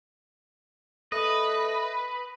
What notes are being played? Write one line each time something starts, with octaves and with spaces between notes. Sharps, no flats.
A3 B4 D#5